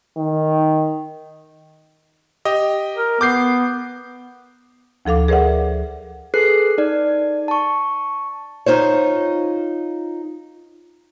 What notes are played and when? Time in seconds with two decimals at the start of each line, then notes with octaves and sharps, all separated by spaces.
0.18 D#3
2.45 G4 D#5
2.96 A#4
3.21 B3 D6 G6 C7
5.05 D2 F3 A4 F5 D6
5.28 G#4 A#4 C5 D5 E5 F#5
6.34 G#4 A4 B4 F#6 C7
6.78 D#4 D5
7.48 A5 C#6
8.66 D#4 F4 C5 C#5